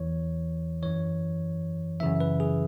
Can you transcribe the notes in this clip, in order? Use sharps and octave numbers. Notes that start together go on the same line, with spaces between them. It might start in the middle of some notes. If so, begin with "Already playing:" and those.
Already playing: E2 E3 C#5
F#2 E3 C#5
F#2 C#3 E3 E5
B4
G#4